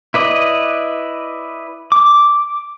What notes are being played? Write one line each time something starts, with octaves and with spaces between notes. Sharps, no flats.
E4 B4 D5 D#5
D6